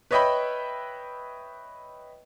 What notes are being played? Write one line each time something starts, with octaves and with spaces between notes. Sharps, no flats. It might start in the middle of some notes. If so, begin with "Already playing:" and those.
B4 C#5 D#5 E5 G5 B5